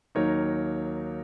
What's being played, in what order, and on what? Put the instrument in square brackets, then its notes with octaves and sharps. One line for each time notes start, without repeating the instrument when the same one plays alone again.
[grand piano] D#2 D#3 F#3 A#3 D#4 A#4 C#5